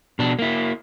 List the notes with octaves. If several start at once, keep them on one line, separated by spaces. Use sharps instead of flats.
B2 D4
A#3 E4